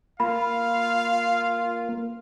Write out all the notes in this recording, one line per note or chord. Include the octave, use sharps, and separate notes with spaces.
A#3 F4 F5 B5